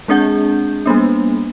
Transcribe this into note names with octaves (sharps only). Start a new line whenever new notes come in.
G#3 C4 D4 G#4 F#5 G6
G3 A#3 B3 D4